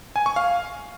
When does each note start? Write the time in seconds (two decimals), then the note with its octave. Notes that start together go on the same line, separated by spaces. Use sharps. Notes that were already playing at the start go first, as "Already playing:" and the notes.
0.16 G#5
0.26 C#6
0.36 F5